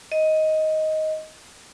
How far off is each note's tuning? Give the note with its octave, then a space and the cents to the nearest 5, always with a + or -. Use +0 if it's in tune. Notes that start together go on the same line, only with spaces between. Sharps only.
D#5 +10